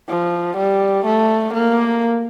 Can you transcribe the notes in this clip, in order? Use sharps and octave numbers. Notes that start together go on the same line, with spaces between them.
F3
G3
A3
A#3